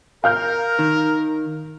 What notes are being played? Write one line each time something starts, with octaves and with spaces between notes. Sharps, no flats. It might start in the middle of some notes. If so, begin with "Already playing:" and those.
A#4 F5 F6 G6
D#3